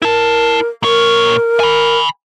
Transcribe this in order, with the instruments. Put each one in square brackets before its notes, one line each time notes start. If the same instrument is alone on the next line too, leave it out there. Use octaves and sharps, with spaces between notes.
[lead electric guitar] E4 A5 [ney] A#4
[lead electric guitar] A#2 C#5 [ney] A#4
[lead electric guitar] G#5 B5